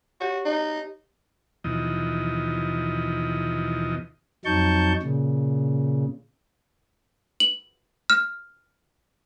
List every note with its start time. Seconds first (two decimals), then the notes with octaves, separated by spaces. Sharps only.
0.21 F#4 G4 C#5
0.46 D#4
1.64 D#2 B2 E3 F3 D#5
4.45 F2 F#3 D#4 A5 C#6 G6
5.03 A#2 C#3
7.40 F#7
8.10 F6